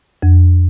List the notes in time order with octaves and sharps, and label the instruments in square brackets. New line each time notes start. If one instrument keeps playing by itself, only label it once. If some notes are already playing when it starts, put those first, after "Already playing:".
[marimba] F2